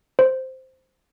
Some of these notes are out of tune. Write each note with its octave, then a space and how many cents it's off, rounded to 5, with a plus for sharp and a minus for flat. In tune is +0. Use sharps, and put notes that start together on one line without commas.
C5 -5